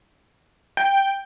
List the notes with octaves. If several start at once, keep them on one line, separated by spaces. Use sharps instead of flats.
G5